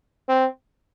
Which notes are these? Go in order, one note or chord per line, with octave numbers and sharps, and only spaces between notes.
C4